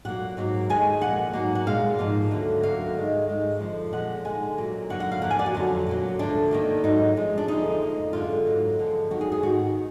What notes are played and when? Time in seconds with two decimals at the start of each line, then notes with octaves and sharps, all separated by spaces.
0.05 A#2 F#3 A#3 F#5
0.37 G#2 F#3 A#3
0.69 D#2 D#3 G#3 G#5
1.01 A#2 F3 A#3 F#5
1.33 G#2 F#3 A#3
1.55 F#5
1.67 A#2 G#3 F5
1.99 G#2 F3 A#3
2.31 D2 D3 F#3 A#3
2.63 D2 D3 F#3 A#3 F5
2.95 G#2 D#3 G#3
3.28 G#2 D#3 G#3
3.60 F2 D3 F3
3.93 A#2 F3 G#3 F#5
4.25 D#2 D3 G#3 G#5
4.57 A#2 F#3 A#3
4.90 F#2 D3 F#3 A#3 F#5
5.00 F#5
5.11 F5
5.22 F2 F3 A#3 F#5
5.31 G#5
5.39 D5
5.46 F#4
5.54 F2 D3 F#3 F4
5.87 A#2 F#3 A#3
6.19 D2 D3 F3 A#3 D4
6.51 D#2 D#3 A#3
6.84 G#2 F#3 A#3 D#4
7.16 F#2 F3 G#3
7.38 D4
7.48 D2 D3 F3 G#3 D#4
7.82 F2 F3 A#3
8.13 F#2 D3 G#3 F4
8.46 G#2 F#3 A#3
8.79 F#2 D3 F3 G#3
9.10 F2 D#3 F#3 A#3 F#4
9.21 G#4
9.32 G#4
9.42 G#2 D#3 A#3 F#4